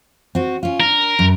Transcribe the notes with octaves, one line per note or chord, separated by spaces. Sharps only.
C4 F#4
C#4 F4
D4 A#4
F#2